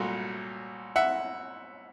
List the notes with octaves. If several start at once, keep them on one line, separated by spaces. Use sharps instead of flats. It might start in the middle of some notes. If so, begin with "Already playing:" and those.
Already playing: C2 A#2 F#3 A3
E5 F#5